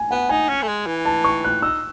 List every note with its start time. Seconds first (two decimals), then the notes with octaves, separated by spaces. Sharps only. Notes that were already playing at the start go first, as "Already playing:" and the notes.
Already playing: G#5
0.11 B3 F#5
0.29 D#4 G#5
0.49 C#4
0.62 A3
0.68 G#3
0.86 E3
1.05 A5
1.24 C#6
1.44 F#6
1.62 D#4 E6